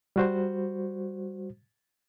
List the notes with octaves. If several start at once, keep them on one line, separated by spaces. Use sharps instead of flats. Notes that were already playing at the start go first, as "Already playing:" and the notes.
G3 F#4 C5